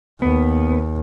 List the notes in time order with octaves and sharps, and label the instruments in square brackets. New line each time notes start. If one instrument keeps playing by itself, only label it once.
[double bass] D#2 [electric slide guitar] B3